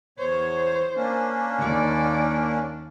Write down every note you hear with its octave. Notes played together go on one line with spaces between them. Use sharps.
E2 C5 C#5
A#3 C#4 D4
D#2 D5